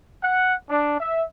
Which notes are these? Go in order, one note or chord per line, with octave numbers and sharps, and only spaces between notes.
F#5
D4
E5